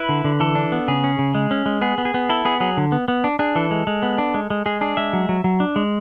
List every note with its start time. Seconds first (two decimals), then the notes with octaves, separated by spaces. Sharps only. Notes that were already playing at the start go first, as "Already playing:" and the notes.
Already playing: E4 B4
0.09 D3
0.24 D3
0.40 E3 A4
0.55 D4
0.72 B3
0.88 C#3 G#4
1.04 C#4
1.19 C#3
1.35 G#3
1.51 C#4
1.66 G#3
1.81 B3 G#4
1.98 B3
2.05 G#4
2.14 B3
2.29 E4 A4
2.45 B3 G#4
2.60 F#3 G#4
2.77 D3
2.92 B3
3.08 B3
3.24 D4
3.39 D4 G#4
3.55 E3 A4
3.71 G#3
3.87 G#3
4.03 B3
4.18 D4
4.34 G#3
4.50 G#3
4.66 G#3 G#4
4.81 D4 G#4
4.97 G#3 E5
5.13 F#3
5.29 F#3
5.44 F#3
5.60 D4
5.76 G#3